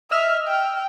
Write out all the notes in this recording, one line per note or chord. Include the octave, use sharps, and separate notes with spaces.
D#5 E5 E6 F6
G5